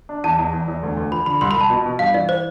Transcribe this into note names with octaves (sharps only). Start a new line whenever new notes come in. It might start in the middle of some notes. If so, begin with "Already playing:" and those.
D4
E2 A5
E2
E2
E2
D2
D2
F3 B5
D3 B5
C2 C6
B5
C2
A5
B2
B2
G2 F5
E3 D5
C5